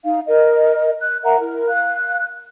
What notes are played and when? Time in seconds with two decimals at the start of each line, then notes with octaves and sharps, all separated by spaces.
0.04 D#4 F5
0.27 A#4 D#5
1.00 F#6
1.23 A#4 E5 F#5 A#5
1.39 E4 A#4
1.67 F5 F#6